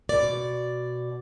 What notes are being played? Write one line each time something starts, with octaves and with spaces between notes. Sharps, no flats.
B2 D5